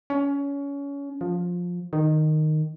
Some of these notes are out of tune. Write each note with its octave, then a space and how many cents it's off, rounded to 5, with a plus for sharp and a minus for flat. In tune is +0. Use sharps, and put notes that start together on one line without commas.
C#4 +25
F3 +15
D#3 -10